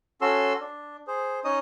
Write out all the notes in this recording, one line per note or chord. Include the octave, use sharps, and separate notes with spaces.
C#4 F#4 A4 C6 E6
D4
G#4 C5
C#4 D#4 C#5 D#5 D#6